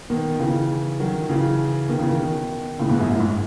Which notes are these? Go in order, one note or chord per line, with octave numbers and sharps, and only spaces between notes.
B2 D#3
C#3 E3
D#3 F#3
C#3 E3
B2 D#3
C#3 E3
B2 D#3
A2 C#3
G#2 B2
F#2 A2
F#2 A2
G#2